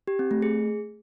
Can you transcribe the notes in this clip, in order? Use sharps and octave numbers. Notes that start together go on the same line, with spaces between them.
G4
C4
A3
G#4